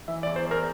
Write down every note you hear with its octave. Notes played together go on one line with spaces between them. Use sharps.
E3 E5
D5
E2
C5
E2 A#4